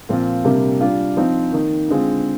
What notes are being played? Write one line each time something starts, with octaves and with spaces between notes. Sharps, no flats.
A#2 F3 C4 F4
C3 G3 A#3 D4
G3 D4 F4
F3 C4 D#4
D#3 A#3 D#4
D3 G#3 C4 F4